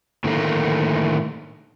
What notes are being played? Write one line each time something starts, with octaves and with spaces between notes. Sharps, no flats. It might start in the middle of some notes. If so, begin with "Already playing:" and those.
A2 D3 D#3 A3 A#3